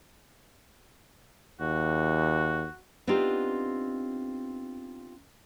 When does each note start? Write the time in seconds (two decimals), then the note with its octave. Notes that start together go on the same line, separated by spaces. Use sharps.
1.61 D#2 F#4
3.07 B3 C4 D4 D#4 F4 G4